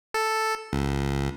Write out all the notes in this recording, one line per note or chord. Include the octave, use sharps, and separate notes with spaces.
A4
C#2